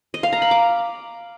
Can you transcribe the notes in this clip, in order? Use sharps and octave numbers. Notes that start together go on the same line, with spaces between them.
D#5
F5
A#5
B5
D6